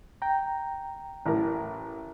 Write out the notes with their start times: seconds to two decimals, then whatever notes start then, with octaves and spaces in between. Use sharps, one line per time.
0.22 G5 A#5
1.26 A1 A2 A#4